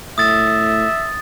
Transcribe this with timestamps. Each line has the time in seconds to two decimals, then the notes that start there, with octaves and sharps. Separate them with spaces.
0.18 A2 E5 D#6 A6